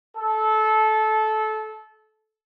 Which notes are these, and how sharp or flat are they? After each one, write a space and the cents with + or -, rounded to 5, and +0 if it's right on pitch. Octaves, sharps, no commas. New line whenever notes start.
A4 -20